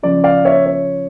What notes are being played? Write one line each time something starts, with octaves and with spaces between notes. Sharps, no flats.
C#3 F3 D5
D5 F5
C#5 E5
C#5